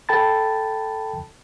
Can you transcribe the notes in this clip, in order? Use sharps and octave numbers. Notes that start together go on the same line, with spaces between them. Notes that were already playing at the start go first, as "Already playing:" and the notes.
A4 G5 A5 B5 A6